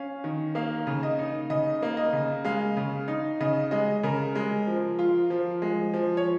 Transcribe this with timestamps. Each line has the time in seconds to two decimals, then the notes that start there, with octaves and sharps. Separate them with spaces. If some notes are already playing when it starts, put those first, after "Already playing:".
Already playing: C#4 F5
0.24 D#3
0.55 A#3 F5
0.87 C#3
1.03 D#5
1.19 D#4
1.50 C#3 D#5
1.82 A#3
1.97 D#5
2.13 C#3
2.45 G#3 F5
2.77 C#3
3.08 D#4
3.40 C#3 D#5
3.71 G#3 D#5
4.03 C#3 A#4
4.35 G#3
4.67 F3
4.99 F4
5.30 F3
5.62 G#3
5.94 F3
6.17 C#5